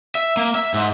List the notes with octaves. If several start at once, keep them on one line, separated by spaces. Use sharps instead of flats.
E5
A#3
E5
G#2